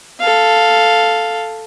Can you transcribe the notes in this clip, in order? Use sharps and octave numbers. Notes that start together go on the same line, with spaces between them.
A4 F5